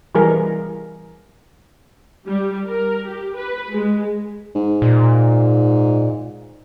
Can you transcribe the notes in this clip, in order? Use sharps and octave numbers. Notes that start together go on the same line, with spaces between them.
E3 G3 G#4 A#4
G3
A#4
G4
B4
G#3
G#2
A#2